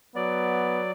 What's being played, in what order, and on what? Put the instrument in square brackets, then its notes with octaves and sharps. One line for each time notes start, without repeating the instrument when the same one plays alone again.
[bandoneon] F#3 D5 [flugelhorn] B3